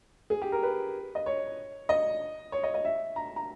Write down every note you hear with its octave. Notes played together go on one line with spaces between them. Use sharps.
G#4
G4
A#4
B4
D#5
C#5
D#5
C#5
D#5
D#5
E5
A#5
A#5